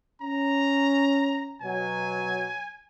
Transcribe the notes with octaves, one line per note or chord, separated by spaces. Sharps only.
C#4 A#5
B2 F#3 G#5